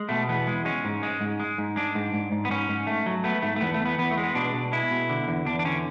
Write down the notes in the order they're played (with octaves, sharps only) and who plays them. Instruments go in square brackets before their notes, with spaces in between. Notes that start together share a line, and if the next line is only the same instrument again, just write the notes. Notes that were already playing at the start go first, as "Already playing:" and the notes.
Already playing: [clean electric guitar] G#3
B2 A3
E2 B3
G#3
G#3 C#4
G#2
G#3
G#2
G#3
G#2
G#3 D4
G#2
G#2
G#2
B3
G#2 C#4
G#2
A3
F#3
A3 B3
G#2 A3
A3
E2 B3
A3
E2
B3
E2 B3
A3
G#3
B3
B2 D4
B2
G#3 E4
B2
D3
E2
E2 D4
D4
D3 C#4